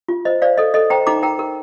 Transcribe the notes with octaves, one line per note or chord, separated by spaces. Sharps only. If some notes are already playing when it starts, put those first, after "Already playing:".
F4
C5 D#5
C5 D5 F5
A4 D#5
A4 D#5
C5 G5 A#5
D#4 A#5 D6
A#4 G5 A#5
A#4